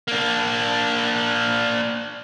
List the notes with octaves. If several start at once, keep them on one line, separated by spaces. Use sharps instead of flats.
A#3 D4